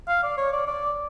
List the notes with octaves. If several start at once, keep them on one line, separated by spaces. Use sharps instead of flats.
F5
D5
C#5
D5
D5